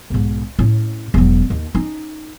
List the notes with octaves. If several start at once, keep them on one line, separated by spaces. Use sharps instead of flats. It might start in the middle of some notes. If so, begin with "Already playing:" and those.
B1 G#2
A2 C#4
E1 F#3
D#2
C#4 D#4